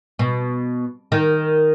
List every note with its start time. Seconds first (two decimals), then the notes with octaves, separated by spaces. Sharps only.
0.19 B2
1.12 D#3